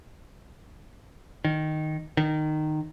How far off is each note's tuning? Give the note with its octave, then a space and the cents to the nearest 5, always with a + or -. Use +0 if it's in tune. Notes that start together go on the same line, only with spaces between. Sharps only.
D#3 -5
D#3 -15